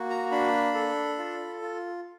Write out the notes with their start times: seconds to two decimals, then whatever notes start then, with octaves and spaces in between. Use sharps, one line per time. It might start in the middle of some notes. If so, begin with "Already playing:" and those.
Already playing: A#3 F#4
0.10 A#5
0.31 D4 B5
0.74 A4
1.18 F4
1.62 F4